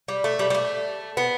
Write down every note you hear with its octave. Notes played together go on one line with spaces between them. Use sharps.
G3
A3
G3
G3
A3
B3